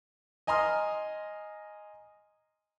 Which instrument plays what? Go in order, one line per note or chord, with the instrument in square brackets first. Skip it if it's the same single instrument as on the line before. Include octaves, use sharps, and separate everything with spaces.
[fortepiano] D#5 G#5 A#5 C6 D#6 F6